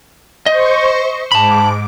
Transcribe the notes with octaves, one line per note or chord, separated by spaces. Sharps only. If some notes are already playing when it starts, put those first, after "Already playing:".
C5 D#5 C#6
G#2 A5 B5 D6